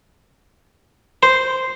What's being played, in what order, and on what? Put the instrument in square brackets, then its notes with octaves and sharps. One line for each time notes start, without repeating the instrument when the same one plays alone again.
[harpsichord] C5